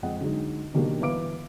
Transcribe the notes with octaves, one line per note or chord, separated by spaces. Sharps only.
F2 G#3 C4 D#5 F#5
D3 F#3 G#3 D#4
B2 D#3 F#3 A#3 D4 G4
G1 E3 B4 F5 D6 D7